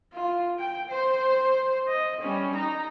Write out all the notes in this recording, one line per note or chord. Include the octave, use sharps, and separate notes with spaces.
F4
G5
C5
D#5
G3 C#4
D#4 A#5